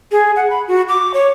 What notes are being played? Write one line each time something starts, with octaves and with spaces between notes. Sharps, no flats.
G#4
F#5
B5
F#4
D6
C#5